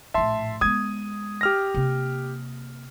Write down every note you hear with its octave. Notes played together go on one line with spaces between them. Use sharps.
A#1 A2 E5 A5 C6
G#3 B3 D#6 G#6
G4 F6 A#6
C3 A#3